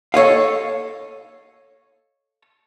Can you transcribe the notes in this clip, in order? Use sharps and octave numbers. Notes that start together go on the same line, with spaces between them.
A4 C#5 D#5 F5